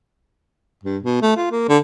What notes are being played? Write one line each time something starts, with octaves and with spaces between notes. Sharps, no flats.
G2
B2
A3
F4
A#3
D3